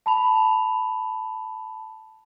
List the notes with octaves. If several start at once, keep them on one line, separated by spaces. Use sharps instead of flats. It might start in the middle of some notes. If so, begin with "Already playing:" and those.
A5 B5 F7